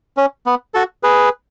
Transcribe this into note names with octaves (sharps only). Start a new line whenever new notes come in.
C#4
B3
F#4 A4
G#4 B4